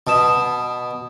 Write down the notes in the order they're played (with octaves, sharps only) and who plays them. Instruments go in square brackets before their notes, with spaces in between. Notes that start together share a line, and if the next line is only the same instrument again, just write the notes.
[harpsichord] B2 [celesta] A5 D#6 E7